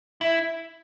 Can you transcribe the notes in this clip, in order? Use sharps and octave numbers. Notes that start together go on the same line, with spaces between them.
E4